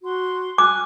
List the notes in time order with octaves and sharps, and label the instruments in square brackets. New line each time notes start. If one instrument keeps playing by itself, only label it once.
[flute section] F#4 C6
[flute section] G#5 F6 F#6 [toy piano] D6